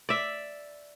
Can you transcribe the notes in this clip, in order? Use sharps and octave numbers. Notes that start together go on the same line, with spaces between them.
D5 E5